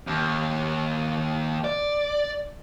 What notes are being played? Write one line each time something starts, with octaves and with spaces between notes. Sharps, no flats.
D#2
D5